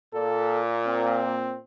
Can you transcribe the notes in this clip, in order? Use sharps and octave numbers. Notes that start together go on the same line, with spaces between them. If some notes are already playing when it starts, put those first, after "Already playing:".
A#2 A4
C4